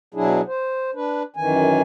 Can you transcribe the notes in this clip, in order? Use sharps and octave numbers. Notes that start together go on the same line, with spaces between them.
B2 F#3 D4 E4 G#4
C5
D4 B4
F#2 D#3 E3 G#5